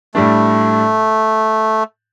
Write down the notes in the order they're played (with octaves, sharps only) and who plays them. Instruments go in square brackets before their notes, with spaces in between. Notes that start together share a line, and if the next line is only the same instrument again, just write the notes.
[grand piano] A2 G3 D4 [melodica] A3